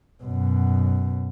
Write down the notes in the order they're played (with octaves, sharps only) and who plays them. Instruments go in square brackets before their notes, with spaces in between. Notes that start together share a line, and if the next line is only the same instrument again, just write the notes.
[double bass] F#2 B2